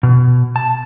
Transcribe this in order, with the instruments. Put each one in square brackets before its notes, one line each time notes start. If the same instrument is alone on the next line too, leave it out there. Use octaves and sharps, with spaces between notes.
[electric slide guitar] B2
A5